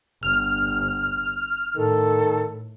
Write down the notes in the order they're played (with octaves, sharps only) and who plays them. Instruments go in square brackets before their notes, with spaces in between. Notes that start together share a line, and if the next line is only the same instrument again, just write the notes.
[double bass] G1 [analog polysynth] F6
[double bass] A2 [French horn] D#3 [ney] A4